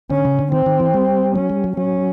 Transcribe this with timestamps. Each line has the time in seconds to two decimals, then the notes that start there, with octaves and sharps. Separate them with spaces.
0.10 D3 C#4
0.25 C#3
0.39 D3
0.52 D#3 C4
0.66 D#3
0.80 E3
0.94 G3
1.35 F#3 C#4
1.50 G3
1.64 F#3
1.77 F#3 C#4